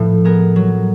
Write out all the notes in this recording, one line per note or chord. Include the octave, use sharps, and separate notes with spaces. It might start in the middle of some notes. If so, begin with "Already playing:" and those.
Already playing: A2 F3 A3 B4
B3 G#4 A#4
F#3